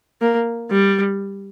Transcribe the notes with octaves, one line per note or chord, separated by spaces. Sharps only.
A#3
G3